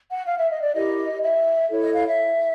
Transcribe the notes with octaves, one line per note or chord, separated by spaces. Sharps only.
F#5
F5
E5
D#5
D5
E4 G4 A#4 D#5
E5
E4 A4 C#5
D#5
F5
E5